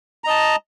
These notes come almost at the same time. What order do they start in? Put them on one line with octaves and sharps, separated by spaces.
A#5 D#5 A5